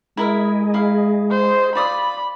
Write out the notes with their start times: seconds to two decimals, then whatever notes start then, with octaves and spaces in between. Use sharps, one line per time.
0.17 G#3 E4 G#4 A#4 D#5 E5
0.74 E4 F5
1.31 C5
1.75 F4 D5 B5 D#6